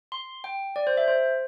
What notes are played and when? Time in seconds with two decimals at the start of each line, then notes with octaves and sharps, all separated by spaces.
0.12 C6
0.44 G5
0.76 D5
0.87 C5
0.97 E5
1.08 C5